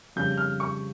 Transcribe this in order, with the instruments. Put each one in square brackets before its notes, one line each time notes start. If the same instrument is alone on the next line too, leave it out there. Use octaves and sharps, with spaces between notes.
[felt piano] F2 C#3 G3 [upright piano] G6
[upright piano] F6
C#6